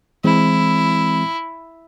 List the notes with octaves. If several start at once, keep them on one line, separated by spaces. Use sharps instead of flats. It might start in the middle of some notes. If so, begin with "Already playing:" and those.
E3 G#3 C4 E4